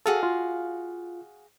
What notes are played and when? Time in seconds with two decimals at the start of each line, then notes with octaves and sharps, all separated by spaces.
0.06 F#4 G#4 A4 F5
0.23 F4